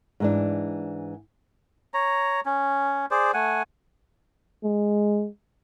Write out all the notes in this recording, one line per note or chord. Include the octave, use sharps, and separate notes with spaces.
G#2 E3 D4
C#5 A#5
C#4
G#4 C5 D5
A3 F#5 G#5
G#3